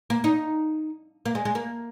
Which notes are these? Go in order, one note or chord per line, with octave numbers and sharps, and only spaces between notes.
A#3
D#4
A#3
G#3
G#3
A#3